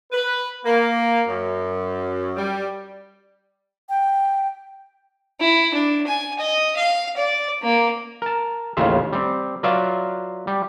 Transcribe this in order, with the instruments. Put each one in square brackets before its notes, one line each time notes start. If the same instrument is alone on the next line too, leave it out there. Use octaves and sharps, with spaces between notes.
[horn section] B4
A#3
F#2
G3
[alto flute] G5
[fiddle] E4
D4
G#5
D#5
F5
D5
A#3
[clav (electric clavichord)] A#4 A5
A1 D#2 C#3 F4 E5
G3 C4
F#3 F4 B4 D5 E5 F5
G3